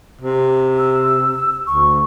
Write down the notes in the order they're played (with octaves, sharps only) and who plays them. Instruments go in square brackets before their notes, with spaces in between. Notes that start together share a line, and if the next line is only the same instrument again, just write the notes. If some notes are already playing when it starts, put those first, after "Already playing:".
[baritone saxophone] C3
[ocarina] E6
[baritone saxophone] D2 [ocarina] C#6